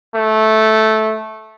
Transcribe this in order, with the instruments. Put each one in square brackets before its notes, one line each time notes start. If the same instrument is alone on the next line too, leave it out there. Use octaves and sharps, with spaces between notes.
[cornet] A3